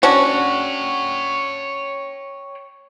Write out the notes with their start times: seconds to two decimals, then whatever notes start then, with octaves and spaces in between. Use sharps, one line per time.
0.03 C#4 D4 F#4 C#5 G5